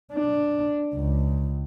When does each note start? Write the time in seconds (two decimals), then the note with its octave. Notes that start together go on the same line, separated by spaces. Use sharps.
0.12 D4
0.94 C#2